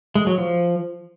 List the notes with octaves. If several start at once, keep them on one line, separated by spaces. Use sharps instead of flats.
G#3
F#3
F3